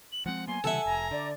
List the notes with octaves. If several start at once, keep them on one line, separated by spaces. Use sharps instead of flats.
F#7
F3 G#3 C4 F#5
F#3 A#3 B3 G#5 C6
C#3 E3 G3 A4 E5 F#5
F1 A#5
D3 D5